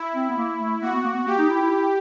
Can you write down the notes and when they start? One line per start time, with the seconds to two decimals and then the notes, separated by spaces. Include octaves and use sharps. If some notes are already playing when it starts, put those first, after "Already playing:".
Already playing: E4
0.15 C4
0.30 B3
0.37 A#3
0.59 A3
0.82 A#3 F#4
0.93 B3
1.04 A#3
1.15 B3
1.26 A#3 G4
1.38 D#4
1.50 E4
1.61 E4
1.71 E4